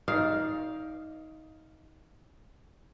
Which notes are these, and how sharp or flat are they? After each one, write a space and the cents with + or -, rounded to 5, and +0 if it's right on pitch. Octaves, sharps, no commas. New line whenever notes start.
D#4 +20 D5 +0 F5 +0